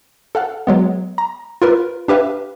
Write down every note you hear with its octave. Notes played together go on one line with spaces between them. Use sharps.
A4 F5 F#5
F#3 G#3 B3
A#5
F4 A#4 B4
D4 G4 B4 E5 F5